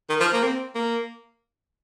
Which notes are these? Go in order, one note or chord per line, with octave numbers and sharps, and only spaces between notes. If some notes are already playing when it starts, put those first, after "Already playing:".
D#3
F3
A#3
C4
A#3